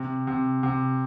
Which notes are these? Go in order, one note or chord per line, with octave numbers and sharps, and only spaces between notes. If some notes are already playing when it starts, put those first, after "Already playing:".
Already playing: C3
C3
C3